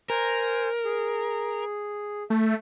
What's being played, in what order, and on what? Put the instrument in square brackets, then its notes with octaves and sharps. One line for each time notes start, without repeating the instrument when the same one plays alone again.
[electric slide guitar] A#4 [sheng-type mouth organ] C5 G#5
[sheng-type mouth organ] G#4
[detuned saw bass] A3 [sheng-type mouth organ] E5